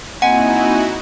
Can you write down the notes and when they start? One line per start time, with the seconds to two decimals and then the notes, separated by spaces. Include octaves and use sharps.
0.22 A#3 C4 D#4 E4 F#4 D#5 F#5 G#5